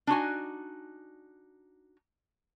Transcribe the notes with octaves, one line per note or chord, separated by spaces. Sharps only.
D4 D#4 F#4 G#5